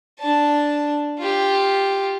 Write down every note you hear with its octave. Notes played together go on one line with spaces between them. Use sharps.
D4 A5
F4 G4